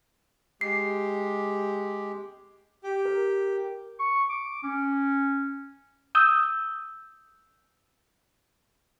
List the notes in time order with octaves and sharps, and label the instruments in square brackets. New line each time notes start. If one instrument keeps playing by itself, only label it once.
[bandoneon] G#3 G4 [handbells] C7
[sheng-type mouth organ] G4
[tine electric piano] A#4
[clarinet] C#6
D6
C#4
[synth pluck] D#6 E6 G6